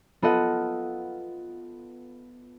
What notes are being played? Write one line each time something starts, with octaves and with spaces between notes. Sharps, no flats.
B3 F4 A4 D#5 F#5